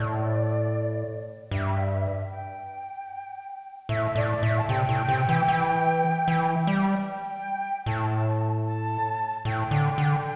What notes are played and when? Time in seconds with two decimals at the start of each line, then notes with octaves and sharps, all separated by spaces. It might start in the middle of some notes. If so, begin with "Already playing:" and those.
Already playing: A2 D5
1.51 G2 E5
2.31 G5
3.89 A2 E5
4.07 E5
4.16 A2 D5
4.43 A2 E5
4.59 A5
4.69 C3 G5
4.89 A2
5.09 C3
5.29 E3
5.48 E3
6.28 E3
6.67 G3
7.07 G5
7.86 A2 A5
8.66 A5
9.45 A2 G5
9.71 D3
9.98 D3